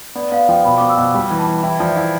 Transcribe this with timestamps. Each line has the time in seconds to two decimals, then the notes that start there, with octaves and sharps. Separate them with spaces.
0.15 B3 D5
0.32 B3 F5
0.49 F3 G5
0.65 B2 B5
0.78 B3 D6
0.89 E6
0.97 B2 D6
1.15 G3
1.30 E3
1.39 A5
1.47 E3
1.63 E4 G5
1.79 F3 D5
1.88 E5
1.97 E4